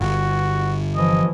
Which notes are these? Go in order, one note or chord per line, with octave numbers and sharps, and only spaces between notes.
G1 F#4
E3 F3 D#5